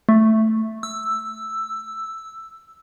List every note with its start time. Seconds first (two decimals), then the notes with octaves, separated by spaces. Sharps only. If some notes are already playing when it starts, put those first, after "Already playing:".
0.09 A3
0.83 E6